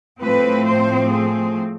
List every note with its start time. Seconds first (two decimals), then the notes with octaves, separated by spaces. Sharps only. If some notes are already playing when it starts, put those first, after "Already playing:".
0.21 A2 F3 A3 C4 B4
0.65 C5
1.09 G#4